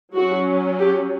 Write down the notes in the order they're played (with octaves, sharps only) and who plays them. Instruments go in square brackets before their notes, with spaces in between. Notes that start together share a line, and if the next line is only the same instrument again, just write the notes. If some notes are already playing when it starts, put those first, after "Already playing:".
[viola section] F#3 C#4 F#4
G4